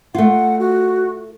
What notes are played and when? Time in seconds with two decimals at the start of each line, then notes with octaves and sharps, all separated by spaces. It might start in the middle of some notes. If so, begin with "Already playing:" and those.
0.15 A3 F4 F#5
0.59 F#4